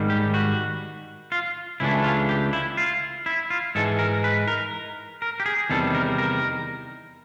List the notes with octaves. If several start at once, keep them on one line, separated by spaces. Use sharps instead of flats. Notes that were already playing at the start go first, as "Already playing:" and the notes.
Already playing: G#2 D#3 G3
G4
F#4
F4
C#2 C#3 E3 A3 D4 E4
F4
G4
E4
F4
E4
F4
G#2 E3 G#3 A4
A#4
B4
A#4
A#4
G4
G#4
E2 C3 D#3 G3 A4
A#4
A#4